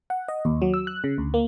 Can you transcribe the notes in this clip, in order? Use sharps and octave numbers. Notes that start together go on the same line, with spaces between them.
F#5
D#5
D#2
F#3
E6
F#6
C#3
D2
A#3